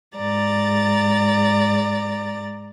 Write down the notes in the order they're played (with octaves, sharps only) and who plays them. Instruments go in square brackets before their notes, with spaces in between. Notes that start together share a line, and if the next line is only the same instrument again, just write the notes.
[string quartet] G#2 D5 A#5 A6